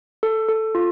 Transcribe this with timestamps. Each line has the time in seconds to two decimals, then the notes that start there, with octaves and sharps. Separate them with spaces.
0.23 A4
0.49 A4
0.75 F4